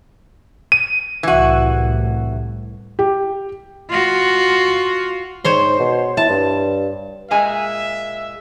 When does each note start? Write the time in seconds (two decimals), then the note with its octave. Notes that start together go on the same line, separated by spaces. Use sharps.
0.72 D#7
1.23 C2 A2 E3 F#4
2.99 G4
3.90 F4 F#4
5.44 G#2 C5 C#5 C6
5.79 B2
6.17 E4 A5
6.29 G2
7.31 A#2 G#3 E5 G#5